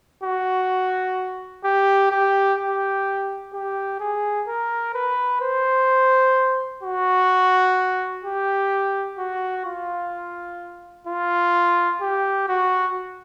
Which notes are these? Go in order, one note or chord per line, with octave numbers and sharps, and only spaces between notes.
F#4
G4
G4
G4
G4
G#4
A#4
B4
C5
F#4
G4
F#4
F4
F4
G4
F#4